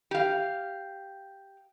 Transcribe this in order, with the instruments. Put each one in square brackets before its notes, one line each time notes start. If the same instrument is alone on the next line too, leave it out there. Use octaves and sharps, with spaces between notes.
[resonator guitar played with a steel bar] G4 F5